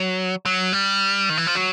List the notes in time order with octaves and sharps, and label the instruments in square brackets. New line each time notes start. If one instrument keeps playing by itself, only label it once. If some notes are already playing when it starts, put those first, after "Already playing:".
Already playing: [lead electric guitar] F#3
F#3
G3
D#3
E3
F3
F#3